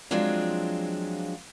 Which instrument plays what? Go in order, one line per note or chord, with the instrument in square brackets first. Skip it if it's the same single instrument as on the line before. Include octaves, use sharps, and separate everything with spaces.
[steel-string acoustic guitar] F3 F#3 G#3 C4 D4 F4